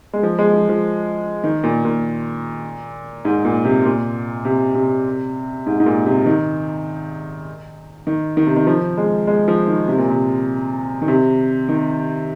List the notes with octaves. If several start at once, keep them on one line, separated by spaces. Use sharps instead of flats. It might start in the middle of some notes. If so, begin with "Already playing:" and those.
G#3
F3
G#3
F3
F3
D#3
A#2
A#2
G#2
A#2
C3
A#2
C3
C3
G#2
G#2
A#2
C3
D#3
D#3
D#3
C3
D#3
F3
G#3
G#3
F3
D#3
C3
A#2
C3
D#3
C3
D#3